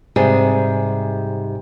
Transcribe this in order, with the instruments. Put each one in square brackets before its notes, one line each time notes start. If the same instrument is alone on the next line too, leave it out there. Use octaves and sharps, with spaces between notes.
[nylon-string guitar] G#2 C3 G3 G#4